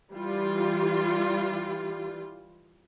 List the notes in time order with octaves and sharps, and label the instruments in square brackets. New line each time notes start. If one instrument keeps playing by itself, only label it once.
[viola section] E3 G3 F4